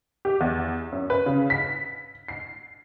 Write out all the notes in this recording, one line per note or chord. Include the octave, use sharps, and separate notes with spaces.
G4
E2
F#2
B4
C#3
B6
C7